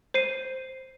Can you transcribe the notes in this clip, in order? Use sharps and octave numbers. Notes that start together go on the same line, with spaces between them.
C5 C7 D#7